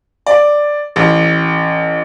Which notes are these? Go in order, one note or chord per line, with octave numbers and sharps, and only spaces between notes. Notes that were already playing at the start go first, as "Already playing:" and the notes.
D5
A1